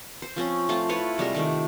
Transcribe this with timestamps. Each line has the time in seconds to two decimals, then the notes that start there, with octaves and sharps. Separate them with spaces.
0.22 C5
0.36 F3 C4 C#4
0.69 A3 C4 F4 A5
0.89 E4 F4 B4 C#5
1.18 C3 G3 G#3 A#4
1.35 D#3 A3